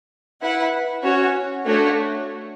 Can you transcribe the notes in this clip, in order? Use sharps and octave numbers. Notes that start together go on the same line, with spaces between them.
E4 B4 F#5
C#4 F#4 C#5
A3 D4 F#4 C#5